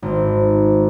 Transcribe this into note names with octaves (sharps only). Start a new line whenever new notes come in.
G#1